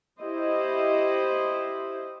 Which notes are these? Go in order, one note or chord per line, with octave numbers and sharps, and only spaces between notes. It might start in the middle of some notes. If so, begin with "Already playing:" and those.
E4 G4 C5 D#5